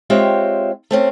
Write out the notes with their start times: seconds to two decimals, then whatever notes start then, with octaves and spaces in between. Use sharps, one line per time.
0.10 G#3 C4 F4 G4 C#5 E5
0.91 A3 C4 C#4